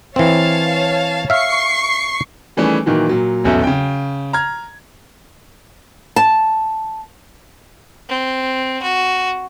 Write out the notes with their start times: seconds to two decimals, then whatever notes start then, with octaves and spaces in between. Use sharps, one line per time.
0.16 E3 C4 C#5 F5 A5
1.30 E5 F5 C#6 C7
2.57 D#3 E3 G3 A3 C#4 G#4
2.86 A#2 D#3 E3 F#3
3.09 A#2 F#3
3.44 D1 B1 E2 C#4 A4 E5
3.64 C#3 G5
4.33 A#5 F6 G#6
6.16 A5
8.09 C4
8.82 F#4